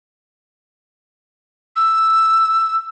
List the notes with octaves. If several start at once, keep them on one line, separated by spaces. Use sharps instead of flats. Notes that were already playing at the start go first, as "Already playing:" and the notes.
E6